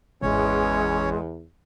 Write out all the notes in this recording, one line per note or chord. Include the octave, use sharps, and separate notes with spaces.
G#1 E2 G#3 C#4 C#5